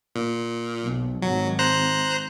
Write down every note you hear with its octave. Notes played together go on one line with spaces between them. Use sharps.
A#2
B1
G#1 F#3
C5 A#5 F#6